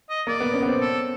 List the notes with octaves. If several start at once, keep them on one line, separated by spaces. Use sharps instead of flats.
D#5
A#3 D5
B3
C#4
B3
C4
A4